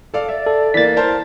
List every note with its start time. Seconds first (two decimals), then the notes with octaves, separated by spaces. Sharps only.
0.14 A4 D5 F5
0.29 D5 E5
0.46 A4
0.74 E3 A#3 A6 B6
0.97 A#4 C5 A5